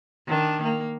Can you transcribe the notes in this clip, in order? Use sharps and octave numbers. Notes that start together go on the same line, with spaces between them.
D#3 D4
A#3